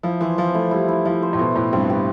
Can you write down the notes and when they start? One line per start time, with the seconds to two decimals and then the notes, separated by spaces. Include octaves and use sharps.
0.03 F3 E4
0.21 E3 C5
0.38 F3 E4
0.54 A3 E4
0.71 G3 E4
0.89 E4
1.05 F3 E4
1.23 C5
1.33 A2
1.39 B2 A3
1.56 A2 B4
1.73 G2 C4
1.90 G4